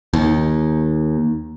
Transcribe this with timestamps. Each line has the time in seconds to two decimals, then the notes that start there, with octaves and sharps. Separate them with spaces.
0.13 D#2